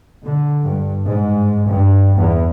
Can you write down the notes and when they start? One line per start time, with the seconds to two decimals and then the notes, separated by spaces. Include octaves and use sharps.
0.25 D3
0.62 G2
1.10 G#2
1.70 G2
2.18 E2